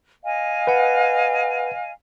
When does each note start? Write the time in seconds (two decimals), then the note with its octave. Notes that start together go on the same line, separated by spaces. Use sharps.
0.25 D#5 F5 G#5
0.67 B4 F#5